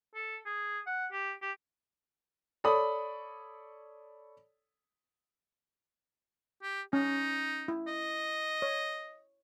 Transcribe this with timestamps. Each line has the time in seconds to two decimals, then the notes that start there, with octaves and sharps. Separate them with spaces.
0.15 A4
0.46 G#4
0.86 F#5
1.12 G4
1.42 G4
2.64 A4 C#5 D5 B5 D#6
6.63 G4
6.93 C#4 D#4
7.68 E4
7.87 D#5
8.62 C#5